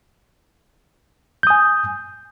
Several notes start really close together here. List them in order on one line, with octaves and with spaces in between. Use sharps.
G6 D#6 G#5